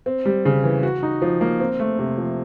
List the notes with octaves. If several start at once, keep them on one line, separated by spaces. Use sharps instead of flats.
C4
G3
C#3
E3
F#4
D#4
F3
A#3
C4
A3
C3
F3